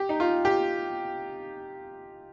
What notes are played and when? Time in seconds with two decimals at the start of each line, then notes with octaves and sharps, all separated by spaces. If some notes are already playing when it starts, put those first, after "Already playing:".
Already playing: G4
0.09 D#4
0.20 F4
0.45 G4